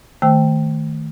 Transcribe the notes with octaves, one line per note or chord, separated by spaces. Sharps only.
D#3 A3 C5 G5 E6